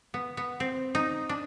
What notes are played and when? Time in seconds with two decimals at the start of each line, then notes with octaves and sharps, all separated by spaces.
0.14 B3
0.37 B3
0.60 C4
0.95 D#4
1.29 D4